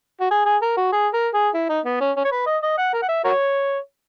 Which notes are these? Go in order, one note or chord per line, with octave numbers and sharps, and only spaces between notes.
F#4
G#4
G#4
A#4
F#4
G#4
A#4
G#4
E4
D#4
B3
C#4
C#4
C#5
B4
D#5
D#5
F#5
A#4
F#5
E5
F#4 A#4 C#5